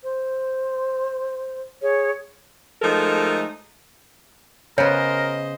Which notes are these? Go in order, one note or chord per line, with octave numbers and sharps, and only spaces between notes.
C5
G#4 C#5
F3 G#3 A3 D#4 A4 A#4
C#3 B3 A#4 C5 C#5 D#5